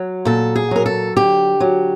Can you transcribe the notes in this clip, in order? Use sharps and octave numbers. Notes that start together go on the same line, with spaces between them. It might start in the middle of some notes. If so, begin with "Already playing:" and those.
Already playing: F#3
A#2 A4
G#4
F#3 A#4
A4
D3 G4
F#3